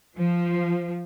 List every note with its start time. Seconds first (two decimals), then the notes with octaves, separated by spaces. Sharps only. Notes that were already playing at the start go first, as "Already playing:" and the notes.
0.16 F3